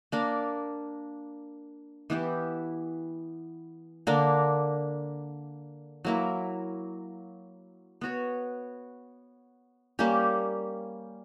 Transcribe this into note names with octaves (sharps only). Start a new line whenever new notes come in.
A#3 D4 A#4 D5
E3 B3 E4 G4
D3 A#3 D4 A#4
F#3 A#3 E4
B3 F#4 C#5
G3 A#3 C#4 G4